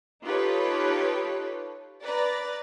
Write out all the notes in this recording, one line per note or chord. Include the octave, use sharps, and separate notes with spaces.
D#4 F4 G4 A4 B4 C#5
B4 D5 A#5 A6